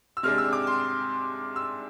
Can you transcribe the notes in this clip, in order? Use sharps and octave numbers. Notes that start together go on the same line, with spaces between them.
E6
C3 G#3 D4 F6
E6
D6
C6
E6